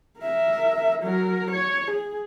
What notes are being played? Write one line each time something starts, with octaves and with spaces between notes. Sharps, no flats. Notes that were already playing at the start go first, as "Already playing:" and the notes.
A#4 E5
F#3 A#4
C#5
G#4